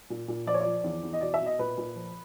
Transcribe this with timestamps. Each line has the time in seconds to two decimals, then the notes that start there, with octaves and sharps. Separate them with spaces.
0.10 A#2
0.28 A#2
0.46 F3 D5
0.54 C#5
0.61 D5
0.66 F3
0.84 E2
1.03 E2
1.13 D#5
1.21 B2 D5
1.34 E5
1.40 B2
1.46 D#5
1.59 A#2 B4
1.78 A#2
1.96 F3